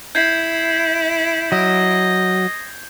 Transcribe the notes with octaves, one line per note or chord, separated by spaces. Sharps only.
E4 G6 G#6 C7
F#3 D#5